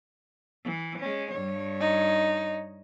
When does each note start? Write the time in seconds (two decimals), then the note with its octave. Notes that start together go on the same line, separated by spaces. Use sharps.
0.64 E3
0.99 G#3 C#4
1.31 G2 C#5
1.80 D#4